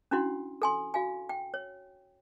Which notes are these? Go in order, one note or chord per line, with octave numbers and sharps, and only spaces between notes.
C#4 D4 E4 F#4 F#5 C6
A4 G#5 C6
F#4 F5 G#5
G5
C#5